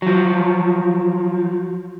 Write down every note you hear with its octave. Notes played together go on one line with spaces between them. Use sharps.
F3 F#3